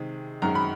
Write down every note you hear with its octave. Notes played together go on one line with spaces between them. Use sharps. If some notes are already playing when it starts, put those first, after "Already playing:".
Already playing: C3 D#3 G#3
F#2 D#3 G#3 A#5
B5